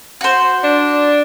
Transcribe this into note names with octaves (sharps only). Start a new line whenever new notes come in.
F#4 C5
D4